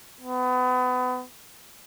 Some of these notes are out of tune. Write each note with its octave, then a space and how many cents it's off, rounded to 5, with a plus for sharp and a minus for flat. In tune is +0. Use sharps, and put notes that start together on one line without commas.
B3 +30